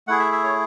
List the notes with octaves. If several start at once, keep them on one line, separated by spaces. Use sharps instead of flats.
A3 E4 G#4 F#5
E5
E5
C#5